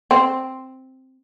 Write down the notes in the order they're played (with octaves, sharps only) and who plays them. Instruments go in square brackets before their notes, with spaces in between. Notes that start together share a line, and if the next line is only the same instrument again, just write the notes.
[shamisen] C4